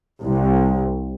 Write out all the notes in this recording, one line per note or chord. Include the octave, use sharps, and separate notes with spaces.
C2